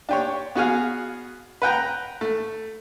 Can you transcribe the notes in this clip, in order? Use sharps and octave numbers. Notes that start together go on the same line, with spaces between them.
D4 G4 C#5
B3 F#4 G#4 F5
B4 F#5 G5 A#5
A3